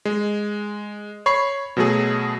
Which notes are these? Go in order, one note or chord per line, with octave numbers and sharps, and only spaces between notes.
G#3
C#5 B5 C#6 C7
B2 F#3 A3 G#4